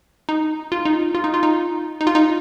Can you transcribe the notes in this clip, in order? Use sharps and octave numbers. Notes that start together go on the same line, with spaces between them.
D#4
F4
D#4
F4
D#4
F4
D#4
D#4
F4
D#4